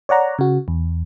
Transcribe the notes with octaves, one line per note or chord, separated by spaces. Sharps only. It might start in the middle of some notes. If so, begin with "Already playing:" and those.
C#5 D5 F#5 A#5
C#3 F#4
E2